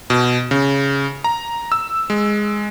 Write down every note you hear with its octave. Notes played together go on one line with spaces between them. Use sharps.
B2
C#3
A#5
E6
G#3